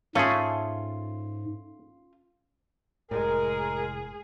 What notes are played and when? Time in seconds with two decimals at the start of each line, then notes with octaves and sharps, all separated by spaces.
0.15 G#2 A3 C#4 F4 G#4
3.11 F1 A2 G#3 G#4 A#4